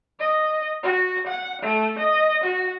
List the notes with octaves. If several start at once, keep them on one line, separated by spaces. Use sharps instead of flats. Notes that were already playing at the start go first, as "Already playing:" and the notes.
D#5
F#4
F#5
A3
D#5
F#4